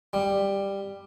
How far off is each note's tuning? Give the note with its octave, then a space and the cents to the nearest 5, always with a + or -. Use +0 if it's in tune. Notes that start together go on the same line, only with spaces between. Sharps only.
G3 +10